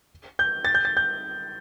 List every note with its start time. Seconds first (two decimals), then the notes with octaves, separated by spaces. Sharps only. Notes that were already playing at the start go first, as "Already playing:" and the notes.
0.39 G6
0.65 A6
0.75 G6
0.85 A6
0.97 G6